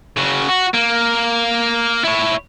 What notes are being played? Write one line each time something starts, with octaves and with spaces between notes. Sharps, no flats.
C#3 F#4
F#4
A#3
E4 C#5